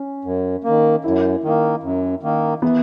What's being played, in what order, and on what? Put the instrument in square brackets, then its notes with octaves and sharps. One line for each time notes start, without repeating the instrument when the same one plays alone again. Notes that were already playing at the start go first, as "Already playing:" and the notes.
Already playing: [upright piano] C#4
[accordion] F#2
D#3 A#3
[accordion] F#2 [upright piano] E4
[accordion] D#3 A#3
F#2
D#3 A#3
[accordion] E3 [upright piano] B3